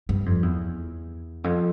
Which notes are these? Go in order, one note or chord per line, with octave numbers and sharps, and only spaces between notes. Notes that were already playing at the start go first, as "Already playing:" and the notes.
G2
F2
E2
F2